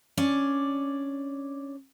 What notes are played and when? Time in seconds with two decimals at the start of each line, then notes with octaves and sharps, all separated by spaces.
0.17 C#4 D4 D5